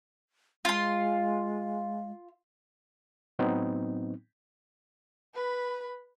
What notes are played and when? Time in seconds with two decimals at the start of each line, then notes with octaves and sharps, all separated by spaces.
0.65 G#3 F4 C6
3.39 A2 F#3 B3 C4 D#4
5.34 B4 B5